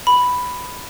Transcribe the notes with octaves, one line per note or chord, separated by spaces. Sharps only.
B5